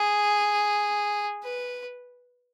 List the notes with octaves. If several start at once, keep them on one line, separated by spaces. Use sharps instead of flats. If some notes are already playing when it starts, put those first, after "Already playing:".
Already playing: G#4
B4